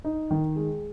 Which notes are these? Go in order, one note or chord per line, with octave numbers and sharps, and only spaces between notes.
D#4
D#3
G#3